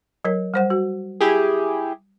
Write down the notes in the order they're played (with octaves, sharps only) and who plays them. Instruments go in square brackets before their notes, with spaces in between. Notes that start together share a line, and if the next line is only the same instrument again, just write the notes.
[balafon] F#3 A#4 C#5
G3 C5 F#5
F#4
[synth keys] E4 G4 G#4